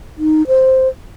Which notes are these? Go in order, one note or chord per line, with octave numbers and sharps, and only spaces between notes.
D#4
C5